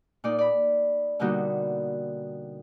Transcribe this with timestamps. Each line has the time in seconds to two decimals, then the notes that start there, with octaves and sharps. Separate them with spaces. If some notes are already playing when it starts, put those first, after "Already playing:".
0.24 A#2 D#4 D5
0.38 D5 B5
1.19 B2 D3 G3 A#3 D#4 F#4